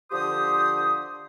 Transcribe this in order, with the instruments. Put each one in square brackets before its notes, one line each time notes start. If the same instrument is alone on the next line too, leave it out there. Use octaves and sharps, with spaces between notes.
[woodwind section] D3 F3 G4 C5 D#6